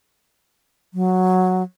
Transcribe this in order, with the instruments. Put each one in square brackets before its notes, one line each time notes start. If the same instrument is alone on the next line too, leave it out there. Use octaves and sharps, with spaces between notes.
[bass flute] F#3